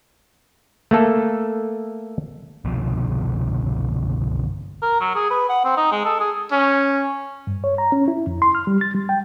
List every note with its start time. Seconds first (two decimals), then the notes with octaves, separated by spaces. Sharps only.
0.91 A3 A#3 A4
2.65 G1 C2 B2 F3
4.82 A#4
5.00 F#3
5.15 G#4
5.30 B4
5.49 F#5
5.65 C4
5.77 D#4
5.92 G#3
6.05 A4
6.20 G#4
6.51 C#4
7.47 G2
7.64 C#5
7.78 A#5
7.92 C#4
8.08 E4
8.27 F2
8.42 C6
8.55 F6
8.67 G3
8.81 A6
8.95 G3
9.09 G5